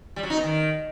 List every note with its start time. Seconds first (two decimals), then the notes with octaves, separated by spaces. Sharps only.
0.16 G3
0.23 F#3
0.30 D#4
0.37 B3
0.44 D#3